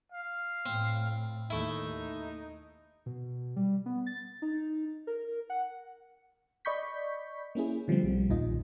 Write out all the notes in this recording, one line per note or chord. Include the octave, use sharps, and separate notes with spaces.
F5
A2 C4
D#2 A3 D#4 E4
B2
G3
B3
A6
D#4
A#4
F#5
D5 D#5 B5 C#6 G6 B6
A#3 C#4 E4 G#4
D3 F3 G3 A3 C4
B1 G3
A#1 D#2 D#3 F4 D#5